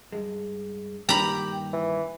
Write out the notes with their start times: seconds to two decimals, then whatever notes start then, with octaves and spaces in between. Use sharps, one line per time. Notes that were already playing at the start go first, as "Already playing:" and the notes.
0.12 G2 G#3
1.09 G2 A#2 D#3 G4 A#5 B5
1.73 E3